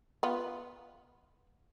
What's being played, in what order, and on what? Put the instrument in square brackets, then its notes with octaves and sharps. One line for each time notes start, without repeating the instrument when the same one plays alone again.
[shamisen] B3 F4